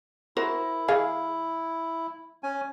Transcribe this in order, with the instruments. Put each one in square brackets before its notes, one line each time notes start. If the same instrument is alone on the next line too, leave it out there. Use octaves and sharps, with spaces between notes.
[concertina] E4 [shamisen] F#4 A#4 C5
[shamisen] E3 G#4 F5
[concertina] C#4 G#5